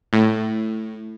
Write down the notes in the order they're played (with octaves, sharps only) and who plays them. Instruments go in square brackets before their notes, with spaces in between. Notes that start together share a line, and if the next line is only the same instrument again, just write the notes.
[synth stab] A2